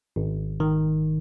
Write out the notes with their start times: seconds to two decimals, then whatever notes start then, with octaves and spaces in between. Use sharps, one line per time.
0.16 G#1
0.60 D#3